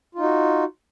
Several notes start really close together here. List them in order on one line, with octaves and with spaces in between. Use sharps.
F4 D#4 F#4